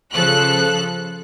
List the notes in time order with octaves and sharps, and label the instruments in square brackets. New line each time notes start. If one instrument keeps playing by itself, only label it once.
[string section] C#3 F3 A4 F#6